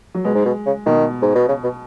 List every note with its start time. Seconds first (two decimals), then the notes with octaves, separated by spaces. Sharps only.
0.14 F#3
0.24 B2 G#3
0.35 G#2
0.45 B2
0.66 C#3
0.86 B2 D#3
1.22 G#2
1.35 B2
1.49 C#3
1.64 B2